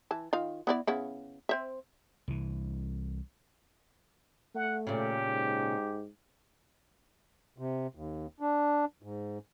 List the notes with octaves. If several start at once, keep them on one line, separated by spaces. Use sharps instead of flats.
E3 A5
D#3 F4 F5
B3 E4 D5
C#3 B3 E4
C4 C5 E5
C2 E3
A3 F#5
A#2 C#3 G4
G#2
C3
D#2
D4
G#2